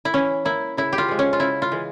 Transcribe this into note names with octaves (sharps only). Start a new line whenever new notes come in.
E4
E3 C#4
A#3 E4
C#3 E4
G4
F4
F3 G#3
C#4
F4
C#3 E4
F4
E3 G#3